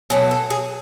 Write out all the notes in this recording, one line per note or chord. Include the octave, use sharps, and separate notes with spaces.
B2 F#3 A3 G#4
A4
G#4